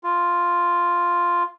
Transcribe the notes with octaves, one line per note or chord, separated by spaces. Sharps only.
F4